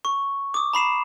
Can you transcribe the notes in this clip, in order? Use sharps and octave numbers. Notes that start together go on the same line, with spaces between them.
C#6
D6 D#6
A#5 B5 C7 E7